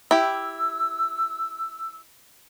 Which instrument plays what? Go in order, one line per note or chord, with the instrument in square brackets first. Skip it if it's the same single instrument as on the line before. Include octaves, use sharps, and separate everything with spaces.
[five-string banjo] E4 G4 [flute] E6